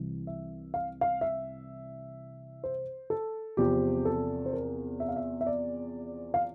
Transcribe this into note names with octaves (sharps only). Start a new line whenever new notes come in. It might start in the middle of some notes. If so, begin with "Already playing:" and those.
Already playing: C2 C3 E3
E5
F5
F5
E5
C5
A4
E2 C3 F3 C4 F4 G4
A4
C5
A#4
E5
F5
E5
E5
D5
F5